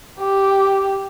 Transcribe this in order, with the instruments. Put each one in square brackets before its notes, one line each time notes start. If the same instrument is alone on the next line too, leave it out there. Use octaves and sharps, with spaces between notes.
[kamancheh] G4